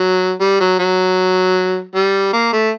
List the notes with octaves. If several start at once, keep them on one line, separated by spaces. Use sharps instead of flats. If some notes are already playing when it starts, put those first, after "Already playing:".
Already playing: F#3
G3
F#3
F#3
G3
A#3
A3